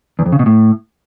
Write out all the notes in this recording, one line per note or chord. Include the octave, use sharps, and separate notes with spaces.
E2
F2
C#3
B2
A2